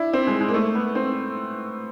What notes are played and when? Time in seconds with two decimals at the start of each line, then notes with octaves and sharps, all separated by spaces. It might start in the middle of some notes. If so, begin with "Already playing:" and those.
Already playing: D4 E4
0.13 C4
0.27 G#3
0.41 G#3
0.48 A#3
0.54 A3
0.75 B3
0.95 C4